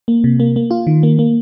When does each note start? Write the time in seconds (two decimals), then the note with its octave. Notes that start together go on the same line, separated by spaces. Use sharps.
0.08 A#3
0.24 C3
0.40 A#3
0.56 A#3
0.71 F4
0.87 D#3
1.03 A#3
1.19 A#3